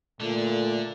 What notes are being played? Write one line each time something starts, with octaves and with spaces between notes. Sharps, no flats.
A#2 D3 A3